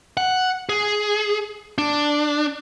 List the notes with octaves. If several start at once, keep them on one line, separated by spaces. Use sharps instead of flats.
F#5
G#4
D4